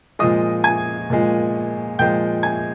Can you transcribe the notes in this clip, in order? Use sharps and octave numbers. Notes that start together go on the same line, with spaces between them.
A#2 F3 G#3 D#5 D#6
G#5 G#6
A#2 F3 G#3
A#2 F3 G#3 G5 G6
G#5 G#6